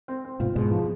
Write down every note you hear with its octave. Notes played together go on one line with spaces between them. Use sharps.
C4
C4
G#2 B2 F4
G#2 B2 G#3
F3